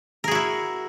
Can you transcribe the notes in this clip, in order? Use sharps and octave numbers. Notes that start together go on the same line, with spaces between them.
E4 F#4 G#4 A#4